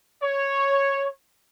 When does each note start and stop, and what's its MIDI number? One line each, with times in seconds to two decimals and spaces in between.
0.22 1.09 73